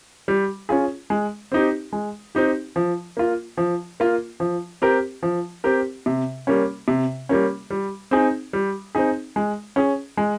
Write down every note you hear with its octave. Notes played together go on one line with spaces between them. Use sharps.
G3
C#4 F4 G#4
G#3
C4 D#4 G4
G#3
C4 D#4 G4
F3
A#3 F4
F3
A#3 F4
F3
C4 G4 A#4
F3
C4 G4 A#4
C3
G3 A#3 C#4
C3
G3 A#3 C#4
G3
C4 D#4 G#4
G3
C4 D#4 G#4
G#3
C#4 G#4
G#3